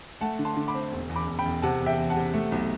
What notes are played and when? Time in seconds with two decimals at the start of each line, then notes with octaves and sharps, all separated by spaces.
0.21 A3 F#5 A5
0.39 D3
0.45 A5 C6
0.57 D3
0.68 B5 D6
0.75 C4
0.92 E1
1.09 E2
1.16 B5 D6
1.27 E1
1.39 G5 B5
1.45 E1
1.62 C3 F#5 A5
1.81 E2
1.86 E5 G5
1.98 E2
2.10 F#5 A5
2.16 C3
2.34 A3
2.52 B1